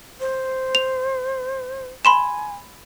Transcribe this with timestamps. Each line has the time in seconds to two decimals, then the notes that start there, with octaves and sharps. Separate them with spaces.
0.20 C5
0.75 F7
2.05 G#5 B5 C6 E7